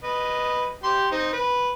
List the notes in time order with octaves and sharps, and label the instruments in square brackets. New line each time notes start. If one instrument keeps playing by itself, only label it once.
[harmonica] B4 D#5
G4 C6
C4 D#4
B4